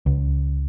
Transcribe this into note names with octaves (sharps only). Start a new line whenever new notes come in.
C#2